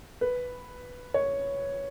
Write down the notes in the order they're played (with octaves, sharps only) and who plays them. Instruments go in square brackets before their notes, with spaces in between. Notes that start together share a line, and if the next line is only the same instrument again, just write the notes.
[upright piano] B4
C#5